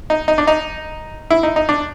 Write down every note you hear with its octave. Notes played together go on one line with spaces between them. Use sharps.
D#4
D#4
D4
D#4
E4
D#4
D#4
D4